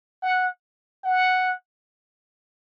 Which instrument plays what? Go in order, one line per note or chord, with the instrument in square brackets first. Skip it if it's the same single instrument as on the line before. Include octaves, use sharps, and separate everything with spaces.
[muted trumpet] F#5
F#5